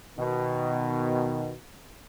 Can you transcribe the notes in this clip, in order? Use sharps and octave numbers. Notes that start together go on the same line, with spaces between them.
B2 D#3